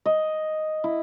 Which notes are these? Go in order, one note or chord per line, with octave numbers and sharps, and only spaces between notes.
D#5
E4